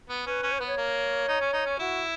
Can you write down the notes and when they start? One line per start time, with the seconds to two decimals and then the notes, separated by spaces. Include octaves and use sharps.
0.10 B3
0.26 C#4 B4
0.43 C#4
0.52 C#5
0.59 B3 B4
0.67 C#5
0.77 A#3
1.28 D#4
1.41 C#4
1.53 D#4
1.66 C#4
1.79 E4 F#4